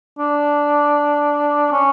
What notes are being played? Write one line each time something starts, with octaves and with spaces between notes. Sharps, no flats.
D4
C#4